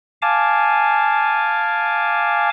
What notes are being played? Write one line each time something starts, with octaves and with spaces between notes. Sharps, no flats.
F5 G#5 A5 D6